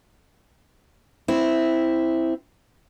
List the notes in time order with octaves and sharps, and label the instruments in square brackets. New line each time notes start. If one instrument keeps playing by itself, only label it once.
[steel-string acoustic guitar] C4 E4